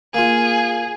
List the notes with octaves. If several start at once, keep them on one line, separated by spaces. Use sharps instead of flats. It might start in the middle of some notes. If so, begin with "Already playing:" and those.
A#3 F4 G#4